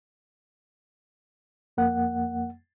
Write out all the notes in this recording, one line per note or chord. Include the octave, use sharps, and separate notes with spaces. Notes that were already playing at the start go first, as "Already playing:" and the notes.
F2 A#3 F#5